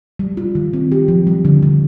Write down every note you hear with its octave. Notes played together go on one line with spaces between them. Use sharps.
G3
F4
D#3
C4
G4
F3
G3
D3
D3